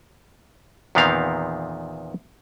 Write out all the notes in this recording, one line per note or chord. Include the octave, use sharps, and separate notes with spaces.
E2 A#2 D#3 B3 C4 F5